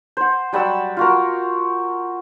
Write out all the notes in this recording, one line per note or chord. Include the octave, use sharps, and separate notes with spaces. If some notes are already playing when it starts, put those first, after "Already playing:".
C5 F#5
F#3 G3 F#5 E6
F4 F#4 A#4